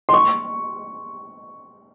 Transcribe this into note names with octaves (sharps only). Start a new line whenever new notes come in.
C6
C#6